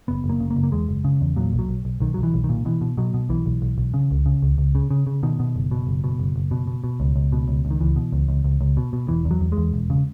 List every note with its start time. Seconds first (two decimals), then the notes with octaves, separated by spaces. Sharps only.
0.08 F#1 B3
0.24 F#1
0.29 A#3
0.40 C#3
0.51 A#3
0.57 F#1
0.63 A#3
0.72 E2 G#3
0.89 F#1
1.04 C#3
1.21 E2
1.36 A#2 F#3
1.53 B1
1.59 F#3
1.69 B1
1.85 B1
2.00 B1 D#3
2.14 F#3
2.17 B1
2.23 E3
2.34 B1
2.44 D#3
2.49 A#2
2.65 B2 E3
2.81 B2
2.97 B2 F#3
3.14 B2
3.29 B1 E3
3.46 B1
3.62 B1
3.78 B1
3.94 C#3
4.11 C#2
4.26 C#3
4.42 C#2
4.58 C#2
4.75 C#3
4.91 C#3
5.07 C#3
5.23 B2 D#3
5.40 B2
5.56 F#1
5.71 B2
5.87 F#1
6.04 B2
6.19 F#1
6.36 F#1
6.51 B2
6.67 B2
6.84 B2
7.00 C#2
7.16 C#2
7.32 B2
7.48 C#2
7.65 C#2
7.71 D#3
7.80 C#2 E3
7.96 B2
8.12 C#2
8.28 C#2
8.44 C#2
8.61 C#2
8.77 B2
8.93 B2
9.08 E1 E3
9.25 E2
9.31 F#3
9.41 E2
9.52 G#3
9.57 E2
9.74 E1
9.90 C#3